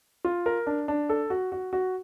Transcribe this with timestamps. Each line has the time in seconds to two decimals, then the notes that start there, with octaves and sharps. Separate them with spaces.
0.25 F4
0.46 A#4
0.67 D4
0.88 D4
1.09 A4
1.30 F#4
1.52 F#4
1.73 F#4